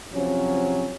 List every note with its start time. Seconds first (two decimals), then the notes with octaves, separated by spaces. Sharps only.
0.13 C3 F3 F#3 C#4